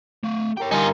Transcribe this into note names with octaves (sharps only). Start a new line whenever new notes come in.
A3 F5
G4 A#4 C#5 G5
G2 D3 D#4 F4 G#5